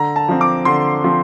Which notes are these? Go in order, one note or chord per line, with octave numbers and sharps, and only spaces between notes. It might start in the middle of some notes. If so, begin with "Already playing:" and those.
Already playing: D3 A#5
A5
F3 C4
D6
D3 C6
F3 C4